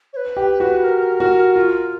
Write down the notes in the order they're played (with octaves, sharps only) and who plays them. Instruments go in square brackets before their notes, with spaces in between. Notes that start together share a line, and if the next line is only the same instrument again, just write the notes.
[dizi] C#5
B4
[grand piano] G4
F#4
[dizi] A#4
[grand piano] F#4
F4